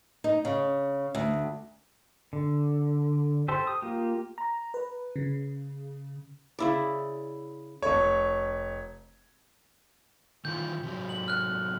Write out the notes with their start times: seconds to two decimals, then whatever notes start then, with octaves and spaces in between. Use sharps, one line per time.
0.24 D#4
0.45 C#3
1.15 D2
2.33 D3
3.48 G4 A4 C5
3.67 D#6
3.82 A#3 F4 G4
4.38 A#5
4.74 B4
5.16 C#3
6.59 C#3 E4 D5
7.82 F1 C#5
10.45 D#3 E3 F4 G6
10.83 C3 F#3
11.09 F#7
11.28 F6 F#6